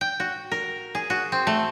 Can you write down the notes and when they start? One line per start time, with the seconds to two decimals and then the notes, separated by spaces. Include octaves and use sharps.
0.01 G5
0.20 F#4
0.52 A#4
0.95 G#4
1.10 F#4
1.32 C4
1.47 A3